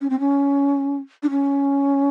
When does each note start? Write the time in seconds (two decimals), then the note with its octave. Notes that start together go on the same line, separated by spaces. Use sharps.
0.01 C#4
0.10 C4
0.20 C#4
1.23 D4
1.30 C#4